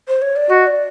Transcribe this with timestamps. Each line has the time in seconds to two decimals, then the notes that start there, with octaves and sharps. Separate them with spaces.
0.08 C5
0.22 C#5
0.36 D5
0.50 F#4 D#5
0.67 D5